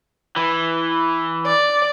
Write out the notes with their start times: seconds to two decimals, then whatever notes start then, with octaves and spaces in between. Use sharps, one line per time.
0.36 E3
1.46 D5